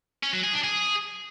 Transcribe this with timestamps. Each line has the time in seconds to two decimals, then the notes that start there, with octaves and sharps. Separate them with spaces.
0.23 C#4
0.33 F#3
0.43 G#4
0.54 D4
0.64 G#4